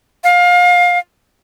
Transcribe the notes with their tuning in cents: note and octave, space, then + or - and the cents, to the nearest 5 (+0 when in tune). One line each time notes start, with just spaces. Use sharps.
F5 +25